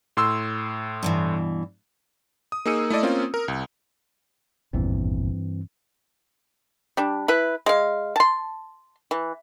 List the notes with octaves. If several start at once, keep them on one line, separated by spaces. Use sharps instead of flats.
A2 C6 E6
G2 B2 E3
D#6
A#3 D#4 G#4 E6 C#7 D#7
A3 E4 A4 D5 D#5
A#3 C4 C#4 F4
A#4
C2
G#1 E2 G2 A#2 E3 C4
G3 D4
E4 B4
G#3 F5
A5 C6
E3